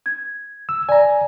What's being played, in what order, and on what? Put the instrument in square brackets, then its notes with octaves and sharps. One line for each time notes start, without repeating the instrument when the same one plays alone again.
[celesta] G#6
[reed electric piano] E6
[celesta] D5 [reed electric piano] G#5 A#5